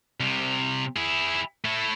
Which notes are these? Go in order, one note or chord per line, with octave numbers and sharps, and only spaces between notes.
C2 C3
E4 G#4
A3 E4